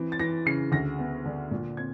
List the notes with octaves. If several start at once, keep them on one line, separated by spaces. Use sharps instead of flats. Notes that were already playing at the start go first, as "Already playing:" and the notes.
Already playing: E3 C4
A6
E3 A#6
C#3 C7
D2 A#6
B3
D3
A#2
C4 G#6